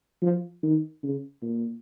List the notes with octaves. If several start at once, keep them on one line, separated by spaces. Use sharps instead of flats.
F3
D#3
C#3
A#2